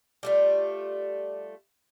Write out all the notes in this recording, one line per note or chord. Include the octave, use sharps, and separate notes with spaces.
G3 A3 F4